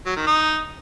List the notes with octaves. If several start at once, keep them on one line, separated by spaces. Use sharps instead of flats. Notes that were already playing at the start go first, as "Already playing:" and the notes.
F#3
D#3
D#4